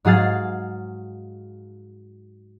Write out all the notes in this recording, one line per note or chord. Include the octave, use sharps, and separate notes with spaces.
G#2 F#3 G#4 F5 A6